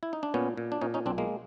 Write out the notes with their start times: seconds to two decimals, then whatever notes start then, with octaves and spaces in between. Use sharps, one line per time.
0.03 E4
0.13 D#4
0.23 D4
0.34 A#2 B3 C#4
0.57 A#2
0.72 D4
0.81 A#2 C#4 D#4
0.94 C#4 D#4
1.06 B1 C4 D4
1.18 G#3 A#3